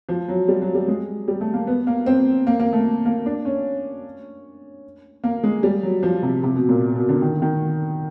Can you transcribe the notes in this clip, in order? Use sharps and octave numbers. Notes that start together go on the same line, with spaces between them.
F3
F#3
G3
F#3
G3
G#3
G3
A3
A#3
B3
A#3
C4
A#3
A#3
A3
A#3
D4
C#4
A#3
G#3
G3
F#3
F3
C3
C3
B2
A#2
B2
D3
D#3
D#3